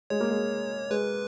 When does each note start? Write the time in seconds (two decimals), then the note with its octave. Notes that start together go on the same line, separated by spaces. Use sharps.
0.10 G#3 C#5
0.20 A#3
0.31 G#3
0.90 G#3 B4